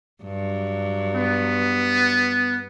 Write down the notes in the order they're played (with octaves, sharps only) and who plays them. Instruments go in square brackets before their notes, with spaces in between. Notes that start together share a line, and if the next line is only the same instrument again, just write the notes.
[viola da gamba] G2 F#3
[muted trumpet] B3